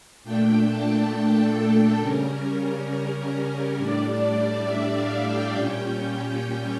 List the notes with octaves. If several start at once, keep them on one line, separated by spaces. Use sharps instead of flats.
A#2 A3 D4 G5
A5
A4
A4
C#3 G3 C#4 A#4
A#4
A2 G3 D4 D5
E5
F5
G5
A#2 G3 C#4